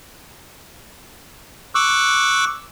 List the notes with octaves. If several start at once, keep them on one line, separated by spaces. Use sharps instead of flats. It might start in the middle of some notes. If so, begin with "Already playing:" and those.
C#6 D6 E6 F#6